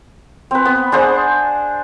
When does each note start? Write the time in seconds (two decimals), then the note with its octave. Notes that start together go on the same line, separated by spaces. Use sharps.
0.51 C4 B4
0.65 B3
0.92 D4 G#4 C5 F#5